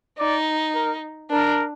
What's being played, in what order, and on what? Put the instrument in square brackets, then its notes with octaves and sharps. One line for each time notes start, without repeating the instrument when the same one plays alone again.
[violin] D#4 [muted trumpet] D5
[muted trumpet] A#4
[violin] D4 [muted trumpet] A#4